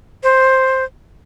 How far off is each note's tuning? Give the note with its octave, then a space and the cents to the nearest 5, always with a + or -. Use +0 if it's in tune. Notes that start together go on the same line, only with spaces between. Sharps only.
C5 +5